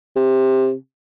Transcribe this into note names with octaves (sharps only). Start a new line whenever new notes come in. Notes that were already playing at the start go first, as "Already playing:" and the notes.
C3